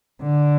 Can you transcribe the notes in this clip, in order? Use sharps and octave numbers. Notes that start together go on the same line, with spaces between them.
D3